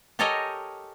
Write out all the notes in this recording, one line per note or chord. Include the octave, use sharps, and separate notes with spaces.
G4 A4 A#4 C#5 D#5 G#5